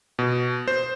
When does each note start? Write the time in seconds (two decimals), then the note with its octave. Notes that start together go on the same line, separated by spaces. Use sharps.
0.19 B2
0.68 C5